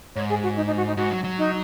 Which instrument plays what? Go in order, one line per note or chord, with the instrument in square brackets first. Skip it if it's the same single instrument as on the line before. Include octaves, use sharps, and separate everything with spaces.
[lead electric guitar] G#2 [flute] C#5
[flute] G#4
F#4
D#4
D#4
F#4
D#4
[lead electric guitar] G#2 [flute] F#4
[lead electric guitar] F#3
F#3
[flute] D#4